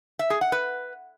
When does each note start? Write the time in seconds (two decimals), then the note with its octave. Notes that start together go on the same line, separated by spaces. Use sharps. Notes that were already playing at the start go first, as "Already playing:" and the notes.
0.19 E5
0.30 G#4
0.41 F#5
0.52 B4